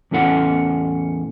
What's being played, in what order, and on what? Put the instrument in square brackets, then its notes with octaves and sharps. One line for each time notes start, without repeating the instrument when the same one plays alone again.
[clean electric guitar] E2 A2 C#4 A4 F#5